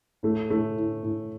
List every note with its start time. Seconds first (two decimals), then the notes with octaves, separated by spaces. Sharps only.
0.23 A2 A3
0.50 A2 A3
0.78 A2
1.03 A2